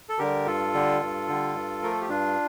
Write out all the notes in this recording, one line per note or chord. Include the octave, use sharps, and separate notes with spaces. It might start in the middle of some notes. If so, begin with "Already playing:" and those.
A4
D3 G3 G4 A#4
G2 F4 A4
D3 G3
G2
D3 G3
G2
F3 A3 A#4
A4
G4
G2 D4 F4